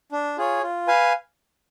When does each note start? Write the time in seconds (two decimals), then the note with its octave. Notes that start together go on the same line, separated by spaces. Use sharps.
0.12 D4
0.37 F4 G#4 C#5
0.63 F4
0.87 B4 F5 G#5